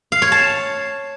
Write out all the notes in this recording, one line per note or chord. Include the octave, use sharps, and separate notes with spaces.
F5
C#5
A5